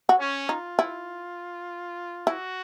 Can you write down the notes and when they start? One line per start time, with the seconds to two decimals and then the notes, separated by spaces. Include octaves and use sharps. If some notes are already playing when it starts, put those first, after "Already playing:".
0.09 F#4
0.19 C#4
0.49 D#4 F4
0.79 E4
2.27 E4 F#4